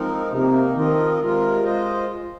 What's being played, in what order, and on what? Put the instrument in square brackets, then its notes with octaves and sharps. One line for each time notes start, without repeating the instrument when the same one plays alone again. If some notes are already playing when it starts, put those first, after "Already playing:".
Already playing: [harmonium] F3 G#3 C4 D#4 A#4
[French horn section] C3 [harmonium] A#3 D#4 A#4
[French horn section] D#3 [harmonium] F3 C4 F4 A#4 D#5
[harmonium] C3 G#3 F4 A#4
G#3 F4 C5 D#5